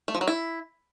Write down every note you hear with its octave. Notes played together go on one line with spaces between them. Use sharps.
A3
F3
F#3
E4